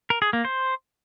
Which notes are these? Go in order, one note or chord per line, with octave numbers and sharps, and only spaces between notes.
A#4
G#4
A#3
C5